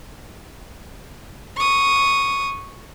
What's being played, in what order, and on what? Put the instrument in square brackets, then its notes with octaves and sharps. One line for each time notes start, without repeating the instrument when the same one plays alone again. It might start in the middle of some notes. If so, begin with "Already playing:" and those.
[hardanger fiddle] C#6 D#6